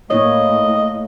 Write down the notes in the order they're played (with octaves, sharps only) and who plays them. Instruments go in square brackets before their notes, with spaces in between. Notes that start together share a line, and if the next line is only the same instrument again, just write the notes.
[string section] A2 [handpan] A#3 E4 C#5 [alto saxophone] D#5